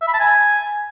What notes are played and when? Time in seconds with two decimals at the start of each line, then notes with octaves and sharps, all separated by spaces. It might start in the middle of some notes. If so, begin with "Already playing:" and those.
0.01 E5
0.08 B5
0.14 A5
0.20 G#5